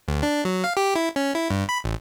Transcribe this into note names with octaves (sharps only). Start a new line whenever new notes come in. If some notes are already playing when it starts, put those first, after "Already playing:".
D2
D4
F#3
F5
G4
E4
C#4
E4
G2
B5
A1